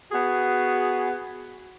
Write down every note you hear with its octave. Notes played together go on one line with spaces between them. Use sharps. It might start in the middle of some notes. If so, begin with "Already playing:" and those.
B3 F#4 G#4